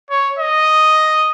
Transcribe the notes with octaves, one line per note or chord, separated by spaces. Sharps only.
C#5
D#5